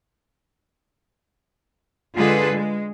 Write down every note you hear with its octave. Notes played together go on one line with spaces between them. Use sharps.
D3 G#3 F4 G#4 A4 B4
G#3